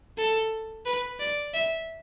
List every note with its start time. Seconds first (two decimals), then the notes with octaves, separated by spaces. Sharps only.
0.18 A4
0.86 B4
1.20 D5
1.54 E5